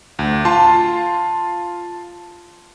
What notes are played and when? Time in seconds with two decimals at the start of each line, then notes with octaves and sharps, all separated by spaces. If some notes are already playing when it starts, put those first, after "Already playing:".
0.19 D2
0.45 F4 A5 C6